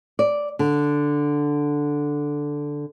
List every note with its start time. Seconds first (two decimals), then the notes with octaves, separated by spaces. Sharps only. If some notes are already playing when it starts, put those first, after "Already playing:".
0.19 D5
0.59 D3